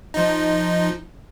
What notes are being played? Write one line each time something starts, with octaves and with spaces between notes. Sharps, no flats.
F3 D#4